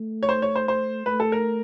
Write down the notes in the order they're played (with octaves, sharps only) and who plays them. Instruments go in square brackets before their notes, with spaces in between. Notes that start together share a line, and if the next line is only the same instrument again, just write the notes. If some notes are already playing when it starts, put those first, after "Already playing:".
Already playing: [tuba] A3
[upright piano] C#5
C5
C#5
C5
C5
[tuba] A3 [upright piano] B4
[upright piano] A4
A#4